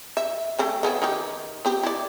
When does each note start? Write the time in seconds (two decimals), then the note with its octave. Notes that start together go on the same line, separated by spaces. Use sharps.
0.17 E5
0.59 A3 C4 C#4
0.83 C#3 B3 E4
1.02 D#3 G4
1.65 B3 C4 G4
1.83 E4 D5